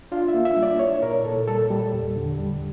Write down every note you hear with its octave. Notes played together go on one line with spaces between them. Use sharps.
D4 F4
E5
A#3
E5
G3
D5
E4 C#5
A#2 A#4
A#2 A4
G3 A4
G3
E2
D3
G3